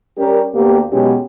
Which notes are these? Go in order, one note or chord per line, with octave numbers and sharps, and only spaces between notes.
G3 C#4 G4 A#4
D2 A#3 B3 G4
E2 B2 F#3 G#3 C#4 G4